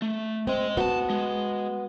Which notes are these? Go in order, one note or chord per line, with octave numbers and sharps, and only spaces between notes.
A3
G#3 C4 D#5
B3 F#4 G5 A5
G#3